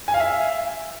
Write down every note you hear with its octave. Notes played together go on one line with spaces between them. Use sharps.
G#5
F5
E5